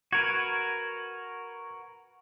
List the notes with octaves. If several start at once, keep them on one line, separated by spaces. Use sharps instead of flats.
F#4 A#4 B4 G#6